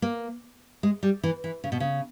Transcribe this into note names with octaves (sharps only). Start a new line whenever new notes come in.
A#3
G#3
G3
E3
E3
C#3
B2
C#3